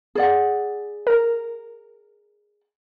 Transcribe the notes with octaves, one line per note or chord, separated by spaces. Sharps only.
G#4 D5 F#5
A#4